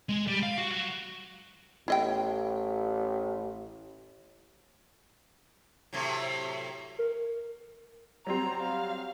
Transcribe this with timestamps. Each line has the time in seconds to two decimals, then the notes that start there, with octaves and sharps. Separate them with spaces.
0.09 G#3
0.28 G3
0.43 F5
0.58 F#4
0.71 F#3
1.88 A1 E4 D#5 G5
5.93 A2 C3 F#3
6.99 A#4
8.27 F#3 G3 C4 A#5
8.62 F5